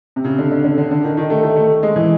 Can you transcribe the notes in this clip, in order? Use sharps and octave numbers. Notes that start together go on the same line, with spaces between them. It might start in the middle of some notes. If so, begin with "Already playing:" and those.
C3
C#3
D3
D3
D3
D3
D3
D#3
D#3
A3
A3
A3
G#3
E3